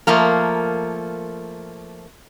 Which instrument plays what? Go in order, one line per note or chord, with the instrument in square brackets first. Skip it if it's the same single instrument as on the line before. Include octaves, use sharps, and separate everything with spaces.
[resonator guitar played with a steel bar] F3 A3 A#3 A#4